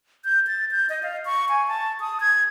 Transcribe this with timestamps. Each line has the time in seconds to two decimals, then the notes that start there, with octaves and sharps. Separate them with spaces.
0.25 G6
0.47 A6
0.71 G6
0.89 D#5
1.03 F5
1.25 C#6
1.49 G#5
1.68 A5
2.00 D#6
2.20 G#6